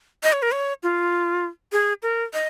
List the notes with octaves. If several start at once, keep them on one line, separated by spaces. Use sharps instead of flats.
D#5
C#5
A#4
C#5
F4
G#4
A#4
D#5